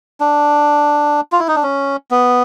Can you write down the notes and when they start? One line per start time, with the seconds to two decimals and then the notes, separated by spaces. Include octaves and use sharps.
0.20 D4
1.32 F4
1.40 E4
1.48 D#4
1.56 D4
1.63 C#4
2.11 B3